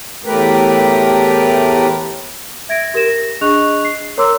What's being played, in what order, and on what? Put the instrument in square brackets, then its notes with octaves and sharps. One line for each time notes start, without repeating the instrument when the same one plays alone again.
[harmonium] E2 A2 A3 G4 A#4 B4
[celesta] E5 G#6 A#6 D7
G4 A#4 A#6 E7
A#6
D4 G#4 D#5 C#6 F#6 F7
C7
A#4 C#5 A#5 C6 D6 E6